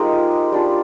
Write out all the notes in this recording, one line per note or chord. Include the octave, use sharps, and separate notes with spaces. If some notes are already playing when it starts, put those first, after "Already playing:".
Already playing: G#3 D#4 F4 G4 A#4 C5
G3 D4 F4